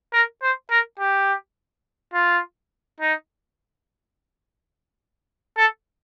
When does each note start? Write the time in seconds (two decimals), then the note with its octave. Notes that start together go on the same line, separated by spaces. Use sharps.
0.13 A#4
0.42 C5
0.70 A#4
0.99 G4
2.14 F4
3.00 D#4
5.57 A4